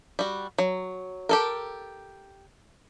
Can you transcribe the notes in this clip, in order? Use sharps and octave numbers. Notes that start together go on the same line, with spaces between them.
G3 F#4
F#3
G4 A4 A#4